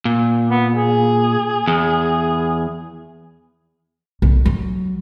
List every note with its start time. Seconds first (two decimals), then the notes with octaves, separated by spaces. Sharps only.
0.05 A#2
0.49 B3
0.74 G#4
1.67 E2
4.22 B1
4.46 F#3